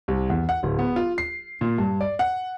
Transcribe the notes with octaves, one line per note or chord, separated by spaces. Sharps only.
C2
E2
F#5
D1
B3
F4
C7
A#2
G2
D5
F#5